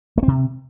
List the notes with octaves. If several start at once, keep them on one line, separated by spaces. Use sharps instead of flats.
A3
C4
C3